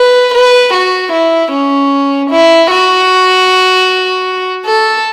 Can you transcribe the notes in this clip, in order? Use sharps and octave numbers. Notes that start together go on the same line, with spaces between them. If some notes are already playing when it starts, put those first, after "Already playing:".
Already playing: B4
B4
F#4
E4
C#4
E4
F#4
A4